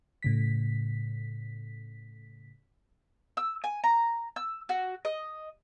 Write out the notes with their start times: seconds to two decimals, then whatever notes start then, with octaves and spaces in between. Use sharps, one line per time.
0.23 A2 C#3 B6
3.37 E6
3.64 G#5
3.84 A#5
4.36 E6
4.69 F#4
5.05 D#5